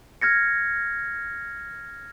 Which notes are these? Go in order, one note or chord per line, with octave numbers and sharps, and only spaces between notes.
F6 G#6 A#6 C#7